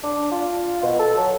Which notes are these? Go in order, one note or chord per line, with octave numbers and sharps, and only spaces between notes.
D4
F4
B2
A4
F#3